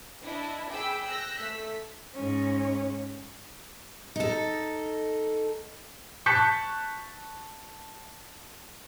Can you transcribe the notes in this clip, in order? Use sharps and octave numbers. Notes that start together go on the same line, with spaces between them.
D4 E4 D#5
G#4 G5 B5 D6 E6 B6
E6 F#6 G6 A#6
A3 E6 B6
G#2 C#4
D#4 A4
A5 C#6 F#6 G6 B6 C#7